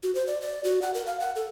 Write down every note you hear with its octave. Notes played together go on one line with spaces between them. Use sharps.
F#4
C5
D5
D5
F#4
F#5
A#4
F5
F#5
A4